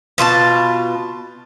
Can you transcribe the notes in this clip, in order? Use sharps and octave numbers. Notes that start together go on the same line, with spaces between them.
B2 F4 G4 A5